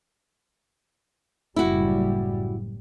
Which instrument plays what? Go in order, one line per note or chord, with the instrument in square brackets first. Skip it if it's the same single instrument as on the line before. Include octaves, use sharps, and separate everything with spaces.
[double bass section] F#1 A2 G3 [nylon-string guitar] E4 F#4